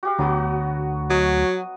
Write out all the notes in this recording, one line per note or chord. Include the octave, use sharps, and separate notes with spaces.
F#4 G4 F5
D2 F#3 B3 F#4
F#3 D#5 D#6